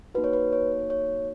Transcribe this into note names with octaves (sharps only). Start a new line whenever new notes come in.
A#3 D#4 F#4 B4
C#5
B4
C#5
C#5